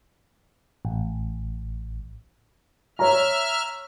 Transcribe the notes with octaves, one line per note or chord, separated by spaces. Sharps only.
A1
C#5 E5 A#5 F6